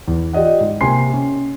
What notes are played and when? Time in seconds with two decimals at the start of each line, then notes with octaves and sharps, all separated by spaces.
0.08 E2
0.33 F4 G4 D5 D#5 F#5
0.61 G#2
0.81 C3 A#3 G#5 C6 C7
1.13 C#4